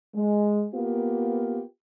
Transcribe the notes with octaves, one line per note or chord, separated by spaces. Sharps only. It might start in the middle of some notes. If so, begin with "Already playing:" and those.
G#3
A#3 B3 F4 G4